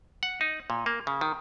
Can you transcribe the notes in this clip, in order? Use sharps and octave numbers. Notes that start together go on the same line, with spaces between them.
F#5
D#4
A#2
A#3
C#3
D#3